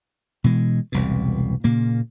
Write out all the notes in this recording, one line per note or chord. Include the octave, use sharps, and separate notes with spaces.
B2 E3 G#3
E1 C2 B2
A#2 C#3 A#3